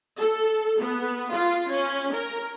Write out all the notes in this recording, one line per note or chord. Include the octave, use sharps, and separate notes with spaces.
A4
B3
F4
C#4
A#4